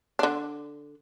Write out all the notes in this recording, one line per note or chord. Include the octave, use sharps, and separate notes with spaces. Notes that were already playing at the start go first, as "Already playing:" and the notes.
D3 D4